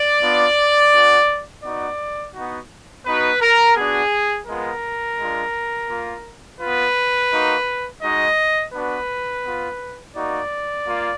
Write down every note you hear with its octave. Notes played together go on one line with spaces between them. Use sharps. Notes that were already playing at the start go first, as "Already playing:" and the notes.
Already playing: D5
B3 D4 F4
B3 D4 F#4
B3 D#4 F#4 D5
B3 D#4 F#4
B3 D#4 F#4 B4
A#4
B3 D4 F#4 G#4
G#3 B3 F4 A#4
G#3 D4 F4
A#3 F4
B3 F4 B4
A#3 D#4 F#4
G#3 D#4 F#4 D#5
B3 D4 F#4 B4
B3 F4
A#3 D#4 F#4 D5
A#3 F4